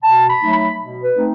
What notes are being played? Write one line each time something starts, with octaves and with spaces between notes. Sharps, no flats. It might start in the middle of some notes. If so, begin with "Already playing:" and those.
B2 A5
B5
F#3 A3 D#4
B5
B2
B4
A3 C4 D#4